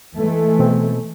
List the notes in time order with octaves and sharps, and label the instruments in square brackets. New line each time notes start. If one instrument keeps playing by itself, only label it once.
[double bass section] E3 G#3 A3
[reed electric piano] B2 C4